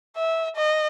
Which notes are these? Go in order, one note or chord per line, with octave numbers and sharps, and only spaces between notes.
E5
D#5